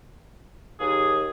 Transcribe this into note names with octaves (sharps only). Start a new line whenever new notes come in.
D#2 G#4